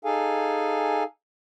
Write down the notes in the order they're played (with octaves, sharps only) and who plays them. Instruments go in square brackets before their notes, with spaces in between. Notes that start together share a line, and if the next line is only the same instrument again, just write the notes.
[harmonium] D#4 G#4 A4 F5 G#5